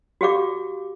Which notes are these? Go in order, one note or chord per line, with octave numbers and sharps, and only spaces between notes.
F#4 G4 F5 D6